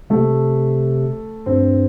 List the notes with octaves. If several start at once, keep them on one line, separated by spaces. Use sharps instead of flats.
C3 A3
G2 C4